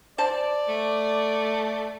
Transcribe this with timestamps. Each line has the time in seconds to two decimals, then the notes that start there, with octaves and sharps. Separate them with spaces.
0.18 C5 D5 A5
0.68 A3